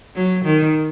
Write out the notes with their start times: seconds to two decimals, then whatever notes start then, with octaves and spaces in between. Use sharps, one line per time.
0.16 F#3
0.45 D#3